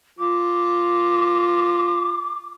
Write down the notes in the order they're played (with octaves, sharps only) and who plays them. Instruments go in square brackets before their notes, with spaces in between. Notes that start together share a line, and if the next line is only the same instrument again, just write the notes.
[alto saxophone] F4 [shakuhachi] D6